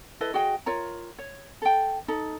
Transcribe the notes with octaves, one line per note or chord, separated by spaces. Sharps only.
E4 A4 B4 D#5
F#4 G#4 D#5 G5
F4 A#4 C#5 A#5
C#5
A4 G5
D#4 A4